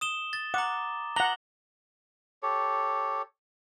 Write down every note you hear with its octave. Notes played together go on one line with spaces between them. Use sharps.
D#6 E7 G7
A6
F#5 A#5 D6
F#5 A#5 F#7 G7
G4 A4 C#5